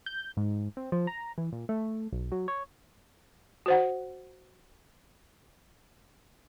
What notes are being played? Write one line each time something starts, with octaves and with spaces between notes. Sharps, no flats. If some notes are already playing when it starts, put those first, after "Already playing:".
G6
G#2
C4
F3
A#5
E3
A#2
A3
B1
F#3
C#5
F#4 C5 F#5